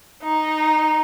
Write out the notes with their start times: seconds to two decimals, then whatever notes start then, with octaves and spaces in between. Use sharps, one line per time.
0.22 D#4